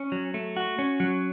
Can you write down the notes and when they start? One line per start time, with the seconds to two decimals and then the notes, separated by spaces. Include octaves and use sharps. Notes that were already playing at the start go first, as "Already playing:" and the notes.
Already playing: C#4
0.12 F#3
0.34 A3
0.57 F#4
0.79 C#4
1.00 F#3